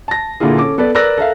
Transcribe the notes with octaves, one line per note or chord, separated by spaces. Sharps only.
A5 A#6
A#2 D3 A#3 E4 F4 G#4
C#4 A4 D6
B3 A4 B4 D5
A#4 B4 D5 E6 F#6 A#6
A4 A#4 E5 F5